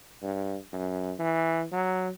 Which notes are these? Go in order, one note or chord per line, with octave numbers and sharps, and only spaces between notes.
G2
F#2
E3
F#3